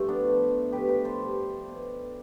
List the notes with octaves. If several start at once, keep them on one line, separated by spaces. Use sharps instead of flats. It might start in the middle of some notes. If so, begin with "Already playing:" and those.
Already playing: G2 F3 A3
B3 D4
A2 F3
A2 F3 G4 B4
G4 B4
A4 C5
G2 F3
B2